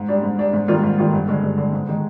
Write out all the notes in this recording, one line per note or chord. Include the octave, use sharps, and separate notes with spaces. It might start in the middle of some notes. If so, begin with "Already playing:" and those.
Already playing: G#2
G3 D4
G#2
G3 D4
G#2
D#3 G3 A#3 F4
G#2
D#3 G3 A#3 F4
G2
D3 G#3
G2
D3 G#3
G#2
D#3 G#3 D#4